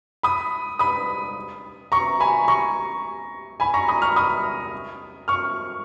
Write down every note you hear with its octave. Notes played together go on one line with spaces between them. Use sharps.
B5 D#6
B5 D#6
A#5 C#6
G#5 B5
A#5 C#6
G#5 B5
A#5 C#6
B5 D#6
C#6 F6
B5 D#6
C#6 F6